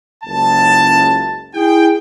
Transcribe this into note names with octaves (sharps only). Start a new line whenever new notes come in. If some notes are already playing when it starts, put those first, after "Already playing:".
F#1 C#2 A5
E4 G#4 G5